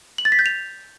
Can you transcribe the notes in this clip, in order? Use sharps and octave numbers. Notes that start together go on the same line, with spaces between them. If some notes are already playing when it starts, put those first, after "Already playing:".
F#7
A6
B6
G6
F7